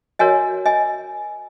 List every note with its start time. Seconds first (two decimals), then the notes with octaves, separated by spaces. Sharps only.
0.19 F#4 A#4 C#5 D#5 G#5
0.66 D#5 G#5